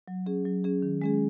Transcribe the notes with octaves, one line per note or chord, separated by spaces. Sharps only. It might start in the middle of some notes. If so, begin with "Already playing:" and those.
F#3
C#4 G#4
F#3
C#4 G#4
D#3
G#3 C#4 G#4